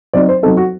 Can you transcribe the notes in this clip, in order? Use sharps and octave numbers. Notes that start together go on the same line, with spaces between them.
F#3 C4 D#4 D5
C5
F#3 C4 D#4 A4
F#4